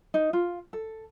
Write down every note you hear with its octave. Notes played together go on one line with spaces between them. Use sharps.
D#4
F4
A4